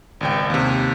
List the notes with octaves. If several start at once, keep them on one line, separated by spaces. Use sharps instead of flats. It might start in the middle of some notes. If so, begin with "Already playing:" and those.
G#1 C#2 G5
D#2 C3